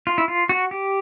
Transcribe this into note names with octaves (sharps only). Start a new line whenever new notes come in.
F4
E4
F4
F#4
G4